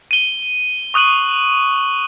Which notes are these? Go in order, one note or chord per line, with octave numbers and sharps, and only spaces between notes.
D#7 G7
C#6 D#6 F#6 D#7 F#7